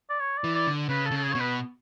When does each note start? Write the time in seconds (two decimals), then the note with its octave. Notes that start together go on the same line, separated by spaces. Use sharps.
0.10 D5
0.20 C#5
0.37 D5
0.44 E3
0.55 D5
0.67 D3
0.89 C#3 B4
1.06 A4
1.11 C#3
1.17 A4
1.24 G#4
1.33 B2 C#5
1.40 B4